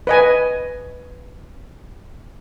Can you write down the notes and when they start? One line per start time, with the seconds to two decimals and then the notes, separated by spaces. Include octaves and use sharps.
0.07 B4 D#5 G#5